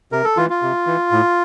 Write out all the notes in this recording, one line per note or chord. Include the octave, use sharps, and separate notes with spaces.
C3 A#4
A4
E3 F4
F4
C3
E3
A2